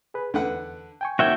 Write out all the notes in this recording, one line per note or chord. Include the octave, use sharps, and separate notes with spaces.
G#4 B4
E2 D3 B4 F#5
G5 G#5 C#6
D#2 A#3 F#4 E5 G5 G#6